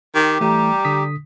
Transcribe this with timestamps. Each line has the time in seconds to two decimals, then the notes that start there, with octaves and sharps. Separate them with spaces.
0.15 D#3 G4
0.41 E3 G3 A3 A#5
0.85 D3 D#6 B6